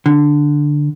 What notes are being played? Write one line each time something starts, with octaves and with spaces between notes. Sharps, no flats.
D3